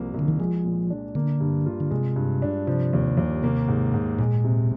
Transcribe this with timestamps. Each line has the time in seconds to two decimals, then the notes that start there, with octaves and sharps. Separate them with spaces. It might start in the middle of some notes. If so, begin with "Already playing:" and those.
Already playing: C2 F3 A#3
0.14 C2
0.19 D3
0.28 D#3
0.39 F3 G#3
0.64 A#2
0.90 D4
1.15 D3 A#3
1.40 G2
1.66 F4
1.80 D3
1.91 C3 G#3
2.16 G2
2.42 D4
2.67 C3 F3
2.93 D#2
3.17 D#2
3.43 C3 A#3
3.68 G#2
3.94 G#2
4.19 A#2 G#3
4.44 C3